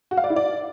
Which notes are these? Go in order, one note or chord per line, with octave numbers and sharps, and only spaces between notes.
F#4
F5
D5
E4
D5